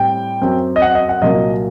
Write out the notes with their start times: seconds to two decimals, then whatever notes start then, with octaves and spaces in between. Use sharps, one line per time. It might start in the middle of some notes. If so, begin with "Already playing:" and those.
Already playing: A2 G3 C4 G5
0.42 F#2 F#3 C4
0.76 D#5
0.82 F#5
0.95 D#5
1.09 F#5
1.22 C2 A#2 F#3 A#3 D#5